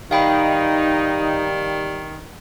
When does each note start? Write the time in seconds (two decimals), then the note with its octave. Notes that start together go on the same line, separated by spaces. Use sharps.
0.11 D#3 G3 D#4 F5 G5 B5